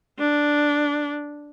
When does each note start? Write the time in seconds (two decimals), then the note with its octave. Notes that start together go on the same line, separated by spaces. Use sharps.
0.19 D4